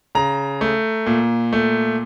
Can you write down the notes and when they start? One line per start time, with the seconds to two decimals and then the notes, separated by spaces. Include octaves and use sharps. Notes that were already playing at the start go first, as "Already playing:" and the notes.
0.15 C#3 A#5
0.61 A3
1.06 A#2
1.53 A3